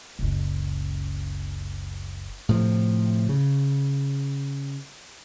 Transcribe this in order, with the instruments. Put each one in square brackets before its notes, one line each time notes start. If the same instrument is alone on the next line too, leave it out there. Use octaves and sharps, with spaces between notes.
[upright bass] F#1 C#2
[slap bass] A2 C3 F3
C#3